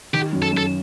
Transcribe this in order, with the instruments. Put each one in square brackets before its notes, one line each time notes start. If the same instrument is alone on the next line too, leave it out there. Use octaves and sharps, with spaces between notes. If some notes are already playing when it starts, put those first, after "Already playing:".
[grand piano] D#3 [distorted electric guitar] G4
[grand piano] F#2
[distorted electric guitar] A4
[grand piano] F#2 [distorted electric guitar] A4